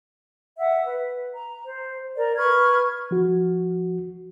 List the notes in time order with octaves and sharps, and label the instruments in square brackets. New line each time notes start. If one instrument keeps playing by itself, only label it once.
[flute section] E5 F#5
B4
A#5
C5
A#4 D5 A#5
B4 C#6 F6 G#6
[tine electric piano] F3 F#4